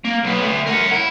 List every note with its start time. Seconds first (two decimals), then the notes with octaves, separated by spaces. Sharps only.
0.05 A#3
0.24 B1 B3
0.42 D3 A3
0.66 A#4 F#5
0.92 E4